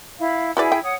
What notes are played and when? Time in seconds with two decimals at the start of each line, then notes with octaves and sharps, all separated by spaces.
0.19 E4 F5
0.57 E4 F#4 G#4 B4 D5 G#5
0.72 G5
0.83 C#5 F#5 D#6